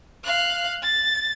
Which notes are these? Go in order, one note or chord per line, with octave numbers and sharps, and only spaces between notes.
F5 F#6
A6